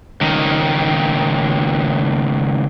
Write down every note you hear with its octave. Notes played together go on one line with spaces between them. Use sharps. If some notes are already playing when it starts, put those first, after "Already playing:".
C#2 D#3